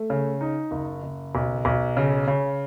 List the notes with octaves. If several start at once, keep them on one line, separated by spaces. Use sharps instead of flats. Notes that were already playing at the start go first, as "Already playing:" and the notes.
Already playing: A3
C#3
D#4
F#1
F#1
B1
B1
C#3
C#3